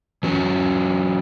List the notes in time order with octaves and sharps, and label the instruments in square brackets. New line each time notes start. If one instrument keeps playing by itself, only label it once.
[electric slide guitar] E3 F#3 C#4